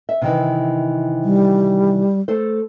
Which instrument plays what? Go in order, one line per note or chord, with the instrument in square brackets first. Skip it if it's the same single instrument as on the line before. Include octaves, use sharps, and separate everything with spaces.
[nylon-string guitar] E5
C3 D#3 E3
[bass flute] G3
[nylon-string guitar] A3 A4 C5